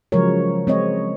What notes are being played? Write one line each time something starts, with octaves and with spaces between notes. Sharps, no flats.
C#3 F3 F#3 G#3 A#4 C#5
G#3 C4 C#5 D#5